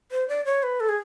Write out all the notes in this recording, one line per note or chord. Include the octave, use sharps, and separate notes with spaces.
C5
D5
C#5
B4
A4
G#4